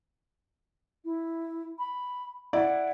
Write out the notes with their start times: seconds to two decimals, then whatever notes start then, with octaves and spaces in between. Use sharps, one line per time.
1.04 E4
1.78 B5
2.53 E4 D5 F#5